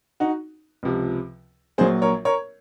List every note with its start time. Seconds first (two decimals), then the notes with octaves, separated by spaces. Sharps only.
0.20 D#4 F#4
0.83 C#2 C3 F3
1.78 A#1 A#2 F#3 G#4 C5
2.02 A#4 C#5
2.25 A#4 C#5